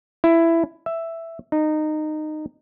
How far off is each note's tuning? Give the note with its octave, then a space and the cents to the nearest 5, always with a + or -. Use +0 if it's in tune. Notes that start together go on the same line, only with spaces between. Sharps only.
E4 +10
E5 +5
D#4 -20